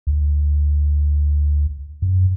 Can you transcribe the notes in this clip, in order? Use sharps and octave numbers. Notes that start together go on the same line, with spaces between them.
D2
F#2